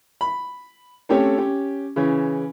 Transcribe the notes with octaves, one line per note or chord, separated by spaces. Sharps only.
B5
A3 C4 C#4 G4 A4 C#5
C#4 G4
C#3 E3 C#4